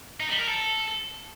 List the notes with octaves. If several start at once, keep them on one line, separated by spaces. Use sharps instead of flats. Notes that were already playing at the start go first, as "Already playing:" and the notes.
D#4
G3
A#4
A4